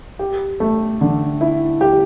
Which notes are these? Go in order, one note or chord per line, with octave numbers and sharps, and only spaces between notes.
G4
A3
D3
E4
G4